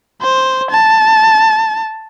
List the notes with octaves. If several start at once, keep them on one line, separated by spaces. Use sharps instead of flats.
C5
A5